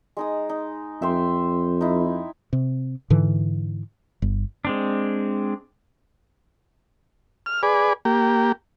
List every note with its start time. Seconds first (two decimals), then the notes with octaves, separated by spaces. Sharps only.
0.17 G#3 D#4 D#6
0.49 D#4
1.02 F2 E5 G5 C6
1.81 D#4 E4
2.53 C3
3.10 G#2 D3 E3
4.22 G1
4.65 G#3 C4 D4
7.46 F6
7.63 G#4 B4 D5
8.05 A#3 G4